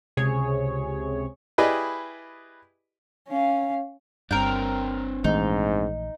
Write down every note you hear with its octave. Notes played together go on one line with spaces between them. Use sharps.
C#2 C3 G#4 C#5
E4 G4 G#4 B4 D5 D#5
C#4 F5
G1 G2 C4 D4 A#4 G5
A#1 G#2 E3 A3 D#4